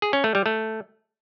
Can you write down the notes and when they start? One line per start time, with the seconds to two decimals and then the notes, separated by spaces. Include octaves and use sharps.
0.02 G#4
0.13 C#4
0.24 A3
0.35 G3
0.46 A3